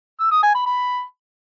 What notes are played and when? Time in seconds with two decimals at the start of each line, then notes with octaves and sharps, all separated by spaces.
0.20 E6
0.31 D#6
0.43 G#5
0.54 B5
0.66 B5